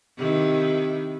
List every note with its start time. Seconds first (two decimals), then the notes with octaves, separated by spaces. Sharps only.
0.17 C3 D#3 E4